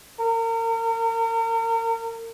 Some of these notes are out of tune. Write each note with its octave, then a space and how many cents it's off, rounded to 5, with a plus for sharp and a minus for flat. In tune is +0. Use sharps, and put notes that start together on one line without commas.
A#4 -35